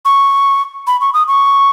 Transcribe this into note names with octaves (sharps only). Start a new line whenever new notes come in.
C#6
B5
C#6
D#6
C#6